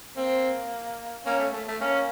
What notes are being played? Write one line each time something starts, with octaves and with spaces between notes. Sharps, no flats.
A#3 C4
A#3 C#4
A3
A3
A3
A#3 C#4